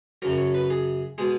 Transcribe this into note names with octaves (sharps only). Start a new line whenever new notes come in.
F#2 C#3 F#3 A#4
C#5
B4
G#4
B2 G#3 G#4